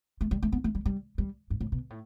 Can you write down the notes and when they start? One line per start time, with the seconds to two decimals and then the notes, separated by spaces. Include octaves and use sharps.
0.21 A3
0.31 G3
0.43 A3
0.52 B3
0.64 A3
0.75 G3
0.86 G3
1.18 G3
1.50 G2
1.61 A2
1.72 B2
1.90 A2